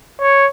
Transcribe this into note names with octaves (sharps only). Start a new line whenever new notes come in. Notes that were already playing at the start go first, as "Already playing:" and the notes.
C#5